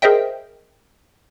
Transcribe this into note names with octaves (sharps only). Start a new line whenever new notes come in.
G#4 A#4 C5 D#5 E5 G5